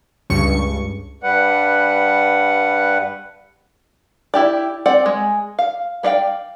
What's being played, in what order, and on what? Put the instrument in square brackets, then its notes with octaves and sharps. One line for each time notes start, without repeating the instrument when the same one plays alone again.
[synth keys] C#2 G2 C#6 C#7
[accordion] G2 G3 B4 F#5
[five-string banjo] E4 G4 D5
C4 D5 F#5
G#3
F5
B3 D4 D5 F5 G5